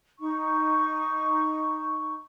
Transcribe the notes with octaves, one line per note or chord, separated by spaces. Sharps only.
D#4 C#6